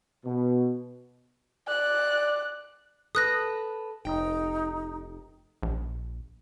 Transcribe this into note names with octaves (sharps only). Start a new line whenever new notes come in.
B2
D5 F#6
A4 B4 D#6 F#6 A#6
F1 D#4 G5
A#1